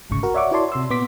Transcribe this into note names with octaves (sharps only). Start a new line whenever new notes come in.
G1 C2 G#2 C#3 C#6
F#4 A#4
C#5 D5 E5 F#5 C#6 D6
E4 F#4 C#5 D5 A5 C6
C3 C6 E6
A#2 B3 C6 D6 B6